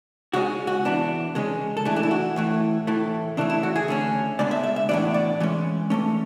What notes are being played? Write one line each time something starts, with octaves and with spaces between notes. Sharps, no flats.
C#3 G#3 C#4 F#4
F#4
E3 B3 D4
C#3 G#3 C#4
A4
E3 A3 D4 G#4
D4
E4
F#4
A2 E3 A3
A2 E3 A3
C#3 E3 A3 D4
E4
F#4
G#4
D3 A3 C#4
C#3 G#3 B3 D4 D5
E5
E5
E5
A2 E3 B3 D4 D5
D5
E3 G#3 C#4
E3 A3 C#4